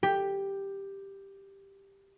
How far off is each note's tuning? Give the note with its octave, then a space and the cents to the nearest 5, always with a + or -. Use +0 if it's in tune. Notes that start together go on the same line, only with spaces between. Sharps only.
G4 +5